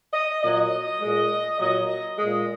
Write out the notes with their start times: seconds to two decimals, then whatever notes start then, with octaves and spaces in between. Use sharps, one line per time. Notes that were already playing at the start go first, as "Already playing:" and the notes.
0.12 D#5
0.42 A#2 F#3 D#5
1.01 A#2 G#3
1.59 A#2 F#3 D#5
2.18 A#2 G#3 D#5